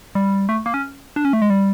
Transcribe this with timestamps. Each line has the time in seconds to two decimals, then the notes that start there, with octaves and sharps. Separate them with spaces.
0.15 G3
0.49 A3
0.66 A#3
0.74 C#4
1.16 D4
1.25 C#4
1.33 A3
1.42 G#3
1.50 G3